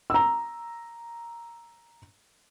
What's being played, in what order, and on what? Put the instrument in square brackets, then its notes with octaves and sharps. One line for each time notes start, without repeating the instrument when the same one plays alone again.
[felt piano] A#5 E6